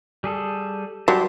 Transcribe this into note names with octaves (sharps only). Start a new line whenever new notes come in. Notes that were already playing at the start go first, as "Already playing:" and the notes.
G3 G#4 A4
F#3 G3 A5 C6 D6